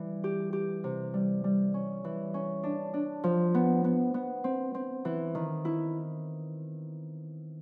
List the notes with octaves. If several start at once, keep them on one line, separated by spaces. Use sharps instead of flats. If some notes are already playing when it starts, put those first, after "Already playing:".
Already playing: E3 G3
G4
G4
C3
G3
G3
C#4
E3
C#4
D4
D4
F3
B3
B3
B3
C4
C4
E3
D#3
E4